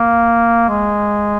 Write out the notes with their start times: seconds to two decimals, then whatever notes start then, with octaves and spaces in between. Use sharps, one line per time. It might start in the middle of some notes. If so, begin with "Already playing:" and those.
Already playing: A#3
0.69 G#3